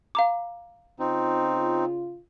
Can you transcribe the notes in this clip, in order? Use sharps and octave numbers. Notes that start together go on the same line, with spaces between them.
F5 A#5 D6
C#3 C4 D#4 F4